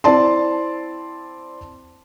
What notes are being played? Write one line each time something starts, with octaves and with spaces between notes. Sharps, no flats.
C4 E4 D5 A5 C6